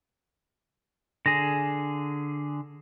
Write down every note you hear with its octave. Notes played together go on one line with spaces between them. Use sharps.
D3 G#4 A#6